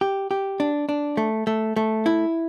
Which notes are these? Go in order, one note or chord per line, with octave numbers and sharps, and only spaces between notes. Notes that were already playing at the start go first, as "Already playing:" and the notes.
G4
G4
D4
D4
A3
A3
A3
E4